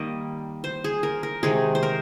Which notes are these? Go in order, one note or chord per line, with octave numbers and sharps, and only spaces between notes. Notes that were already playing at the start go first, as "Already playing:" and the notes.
Already playing: D#3 G3 A#3 D#5
C5
G#4
A#4
A#4
C3 D#3 G#3 D#4 G#4
C5
A#4